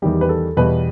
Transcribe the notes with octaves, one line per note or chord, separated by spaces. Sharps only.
E2 D#3 G3 G4
B4
A4
E2 B2 G3 B4